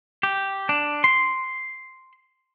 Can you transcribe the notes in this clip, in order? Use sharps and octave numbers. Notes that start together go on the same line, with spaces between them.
G4
D4
C6